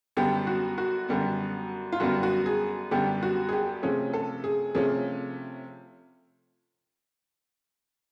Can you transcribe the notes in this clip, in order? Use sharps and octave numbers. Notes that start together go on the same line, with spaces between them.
F#2 D3 G3 B3 G4
F#4
F#4
F#2 D3 G3 B3
F4
F#2 D3 G3 B3 F#4
F#4
G#4
F#2 D3 G3 B3 G4
F#4
G#4
G4
C3 F3 A3 C#4 G#4
A4
G#4
C3 F3 A3 C#4 G#4